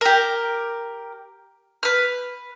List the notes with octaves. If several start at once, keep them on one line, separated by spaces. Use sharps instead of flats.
G4 A#4
B4 F6